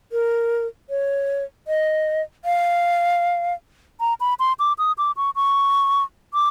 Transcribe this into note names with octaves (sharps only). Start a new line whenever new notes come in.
A#4
C#5
D#5
F5
A#5
B5
C6
D6
D#6
D6
C#6
C#6
D6